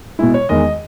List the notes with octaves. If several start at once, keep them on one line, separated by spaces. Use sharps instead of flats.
B2 G#3 E4
C#5
E2 D#3 G#3 D#5